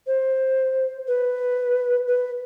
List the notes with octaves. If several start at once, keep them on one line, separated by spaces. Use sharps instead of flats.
C5
B4
B4